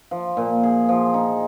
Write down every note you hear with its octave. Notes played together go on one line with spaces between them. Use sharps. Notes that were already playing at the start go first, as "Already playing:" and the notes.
F3
A#2
G#4
F3
D#4